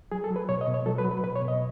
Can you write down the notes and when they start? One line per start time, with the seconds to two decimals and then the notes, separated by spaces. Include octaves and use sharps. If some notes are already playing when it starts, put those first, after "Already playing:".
0.12 F#3 G#4
0.24 A4
0.30 F#3
0.36 B4
0.49 B2 C#5
0.61 D#5
0.67 B2
0.74 C#5
0.86 F#3 A4
0.98 B4
1.04 F#3
1.11 B4
1.23 B2 B4
1.36 C#5
1.42 B2
1.48 D#5